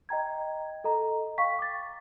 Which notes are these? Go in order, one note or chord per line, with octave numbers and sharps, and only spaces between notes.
D#5 G5 A#5 G#6
A4 D#5 A#5
F5 G5 C#6 B6
D6 A6